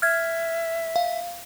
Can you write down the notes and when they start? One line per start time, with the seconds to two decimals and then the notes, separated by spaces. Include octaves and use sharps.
0.02 E5 F6 G#6
0.96 F5